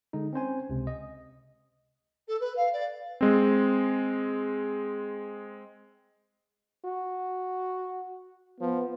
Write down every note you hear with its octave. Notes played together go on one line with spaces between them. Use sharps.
D3 G#3 D#4
C4 C#4 C5 G#5
C#2 C3
D#5
A4
B4
F5
D5
G#3 C4
F#4
F3 B3